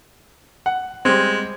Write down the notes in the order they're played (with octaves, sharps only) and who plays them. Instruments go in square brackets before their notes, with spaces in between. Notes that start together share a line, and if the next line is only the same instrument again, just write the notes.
[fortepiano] F#5
[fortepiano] G3 C4 [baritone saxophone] G#3